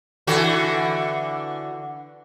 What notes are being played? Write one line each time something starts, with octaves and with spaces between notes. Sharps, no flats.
D3 E3 F#4